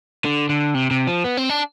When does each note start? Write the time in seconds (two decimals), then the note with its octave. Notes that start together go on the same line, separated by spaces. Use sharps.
0.25 D3
0.49 D3
0.75 C3
0.91 C3
1.07 F3
1.24 B3
1.37 C4
1.50 D4